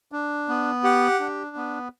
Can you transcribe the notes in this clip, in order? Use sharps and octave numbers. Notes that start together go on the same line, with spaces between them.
D4
B3
G4 F#5
D4
B3